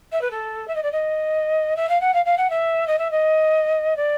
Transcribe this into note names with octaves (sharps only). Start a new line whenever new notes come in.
E5
B4
A4
E5
D#5
D5
D#5
E5
F5
F#5
F5
F5
F#5
E5
D#5
E5
D#5
D5